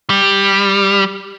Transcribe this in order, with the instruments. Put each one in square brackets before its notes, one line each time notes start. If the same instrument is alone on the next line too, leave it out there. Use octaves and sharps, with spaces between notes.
[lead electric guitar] G3